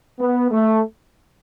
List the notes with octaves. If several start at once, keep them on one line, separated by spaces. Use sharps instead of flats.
B3
A3